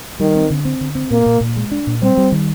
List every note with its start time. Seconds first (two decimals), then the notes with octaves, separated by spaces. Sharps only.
0.20 D#3 G3
0.36 C4
0.50 D3
0.65 C4
0.81 D3
0.95 C4
1.11 A#2 A#3
1.26 A#2
1.41 A#2
1.57 G#3
1.72 D4
1.87 A#2
2.02 G3 C4
2.17 G3
2.32 D#3